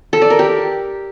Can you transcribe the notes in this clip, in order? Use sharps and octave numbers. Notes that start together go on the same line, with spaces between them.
A4
D5
A#4
G4